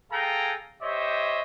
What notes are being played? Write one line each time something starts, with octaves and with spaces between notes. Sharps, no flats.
G#4 A4 F5 G5 G#5 A#5
G4 C5 C#5 D#5 E5